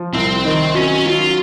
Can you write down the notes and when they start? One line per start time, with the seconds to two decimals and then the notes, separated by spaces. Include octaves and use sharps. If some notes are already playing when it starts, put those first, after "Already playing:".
Already playing: F3
0.14 C2 C4
0.44 D#3
0.74 F#3 C#4
1.06 F#3 F4